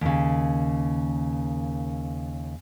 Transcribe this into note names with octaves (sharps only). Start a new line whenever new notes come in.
D#2 C#3